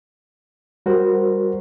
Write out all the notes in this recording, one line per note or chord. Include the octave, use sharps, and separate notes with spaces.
G3 F#4 A#4 C5